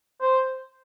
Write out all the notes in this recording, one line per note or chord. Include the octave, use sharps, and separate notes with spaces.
C5